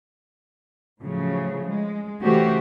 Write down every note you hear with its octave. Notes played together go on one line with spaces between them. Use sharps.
A2 C#3 F3 F#3
G#3
C#3 E3 A3 F#4 G4 C5